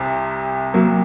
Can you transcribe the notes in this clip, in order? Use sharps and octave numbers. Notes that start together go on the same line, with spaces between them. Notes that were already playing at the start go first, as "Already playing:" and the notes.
Already playing: C2 C3
F#3 A#3